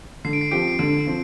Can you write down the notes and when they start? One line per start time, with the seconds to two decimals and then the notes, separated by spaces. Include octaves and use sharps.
0.25 D3 C7
0.33 D7
0.41 C7
0.51 F3 C4 G4 D7
0.68 C7
0.79 D3 D7
1.06 F3 C4